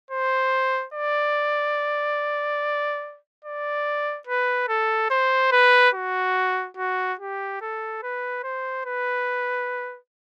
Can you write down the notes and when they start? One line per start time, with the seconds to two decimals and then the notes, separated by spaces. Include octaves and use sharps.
0.11 C5
0.94 D5
3.44 D5
4.27 B4
4.68 A4
5.10 C5
5.52 B4
5.94 F#4
6.77 F#4
7.19 G4
7.61 A4
8.03 B4
8.44 C5
8.86 B4